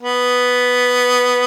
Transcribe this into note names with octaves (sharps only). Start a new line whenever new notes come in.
B3